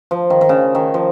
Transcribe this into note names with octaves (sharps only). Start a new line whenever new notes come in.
F3
D#3
D#3
C#3
D#3
F3